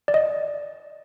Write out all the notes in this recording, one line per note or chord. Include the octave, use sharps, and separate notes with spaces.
D5
D#5